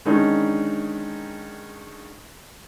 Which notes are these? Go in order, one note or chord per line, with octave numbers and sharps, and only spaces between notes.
D3 D#3 G#3 C#4 D#4